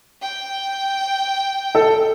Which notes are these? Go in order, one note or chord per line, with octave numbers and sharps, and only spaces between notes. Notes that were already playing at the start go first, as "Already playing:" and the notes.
G5
A4